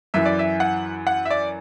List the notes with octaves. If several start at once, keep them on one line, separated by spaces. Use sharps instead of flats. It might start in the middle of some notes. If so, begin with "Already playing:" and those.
F#2 E3 E5
D5
E5
F#5
F#5
E5
D5